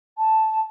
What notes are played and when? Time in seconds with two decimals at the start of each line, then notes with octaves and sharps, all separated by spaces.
0.17 A5